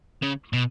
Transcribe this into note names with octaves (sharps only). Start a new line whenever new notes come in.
C#3
B2